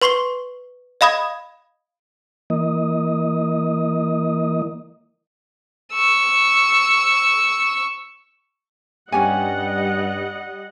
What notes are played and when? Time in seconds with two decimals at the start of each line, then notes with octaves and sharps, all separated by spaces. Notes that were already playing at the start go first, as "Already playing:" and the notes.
0.02 B4 C6 C#6 C7 G7
1.01 D#5 F5 B5 D#6 G#6
2.50 E3 A#3 D#5
5.93 C#6 E6
9.12 G2 G3 C#4 G4 D#5 F#5 G#5